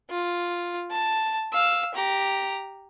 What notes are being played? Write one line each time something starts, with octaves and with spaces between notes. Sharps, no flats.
F4
A5
F5 E6
G4 A#5